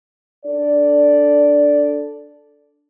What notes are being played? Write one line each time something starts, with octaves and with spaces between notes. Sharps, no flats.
D4 A4 D5